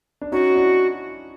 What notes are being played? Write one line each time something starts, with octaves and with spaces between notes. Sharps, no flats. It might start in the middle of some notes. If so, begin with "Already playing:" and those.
D4
C#4 D#4 F#4
D4 E4